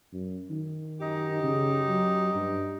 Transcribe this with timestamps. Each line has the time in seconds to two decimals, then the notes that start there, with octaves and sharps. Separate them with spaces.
0.13 F#2
0.50 D#3
1.00 F#2 D#4 G4
1.43 C#3
1.89 F#3
2.35 G2